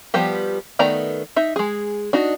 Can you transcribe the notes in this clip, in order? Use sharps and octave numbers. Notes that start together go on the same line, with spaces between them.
F3 G3 B3 G4
D#3 A3 B3 D5 A#5
D#4 E5
G#3 G#4
D4 D#4 F#4